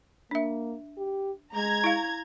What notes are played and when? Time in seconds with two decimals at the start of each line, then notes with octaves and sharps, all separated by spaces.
0.31 A#3 D4 E5
0.97 G4
1.54 G#3 A#5 G#6
1.84 E4 F5